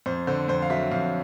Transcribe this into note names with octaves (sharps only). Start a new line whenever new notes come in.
F2 C5
D3 C5
F2 C5
F5
F#3 E5
F2 F5